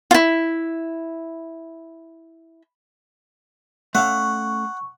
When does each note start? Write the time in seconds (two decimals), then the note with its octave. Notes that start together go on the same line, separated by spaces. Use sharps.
0.11 E4 F4
3.95 A3 C#4 F5 F#5 C#6